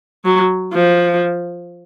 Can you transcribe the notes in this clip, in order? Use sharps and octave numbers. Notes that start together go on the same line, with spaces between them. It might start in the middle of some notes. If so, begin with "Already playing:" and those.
F#3
F3